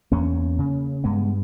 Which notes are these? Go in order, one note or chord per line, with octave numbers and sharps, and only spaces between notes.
E2 A#3 C#4
C#3
G2 G#3 B3